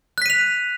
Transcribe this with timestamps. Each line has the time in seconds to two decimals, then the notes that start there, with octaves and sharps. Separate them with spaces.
0.18 F#6
0.22 B6
0.26 D#7
0.30 F7